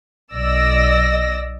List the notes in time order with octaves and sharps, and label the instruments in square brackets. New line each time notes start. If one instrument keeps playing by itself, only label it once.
[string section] B1 D5 D#5 E6 A#6